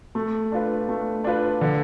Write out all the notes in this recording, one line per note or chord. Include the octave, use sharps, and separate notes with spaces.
A3
D4 F4 B4
A3
D4 F4 B4
D3